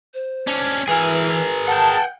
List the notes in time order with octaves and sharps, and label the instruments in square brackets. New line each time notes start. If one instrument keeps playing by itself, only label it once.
[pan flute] C5
[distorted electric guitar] C#4 D4
[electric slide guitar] E3 G#5 [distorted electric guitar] G#4 A#4 [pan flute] B4
[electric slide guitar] F#5 G5 [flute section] A5